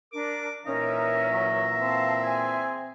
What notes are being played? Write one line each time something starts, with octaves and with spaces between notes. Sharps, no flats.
D4 A#4 D6
A#2 E3 C#4 D#4 A#4 E5 A#5
F#3
C4 F5 A5
G#4 G#5